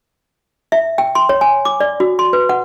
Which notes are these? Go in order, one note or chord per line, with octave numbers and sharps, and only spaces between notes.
E5
G5
C6
C#5
G#5
D6
D5
F#4
C6
B4
F#5